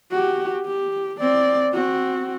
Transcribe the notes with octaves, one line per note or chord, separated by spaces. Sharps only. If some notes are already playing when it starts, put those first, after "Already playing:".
F#4 G4
G4
C4 D5
C4 F#4